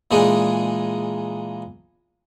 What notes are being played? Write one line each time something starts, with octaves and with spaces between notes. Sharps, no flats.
A#2 E3 G#3 D4 D#4 G#4